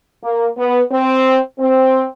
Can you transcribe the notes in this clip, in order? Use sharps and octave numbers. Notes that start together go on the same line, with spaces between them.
A#3
B3
C4
C4